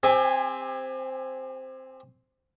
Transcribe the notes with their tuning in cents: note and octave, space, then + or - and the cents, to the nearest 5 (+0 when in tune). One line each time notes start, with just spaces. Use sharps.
C4 +0 G4 +35 G#5 +0